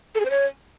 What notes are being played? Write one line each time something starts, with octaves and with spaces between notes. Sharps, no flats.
A4
G#4
C5
C#5